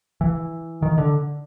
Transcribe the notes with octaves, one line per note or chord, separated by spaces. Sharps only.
E3
D#3
D3